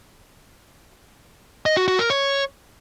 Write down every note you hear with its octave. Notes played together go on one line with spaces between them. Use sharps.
D#5
F#4
F#4
A#4
C#5